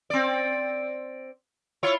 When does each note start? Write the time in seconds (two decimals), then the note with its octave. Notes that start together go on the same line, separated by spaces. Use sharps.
0.10 C4 D5
1.83 E4 F4 C#5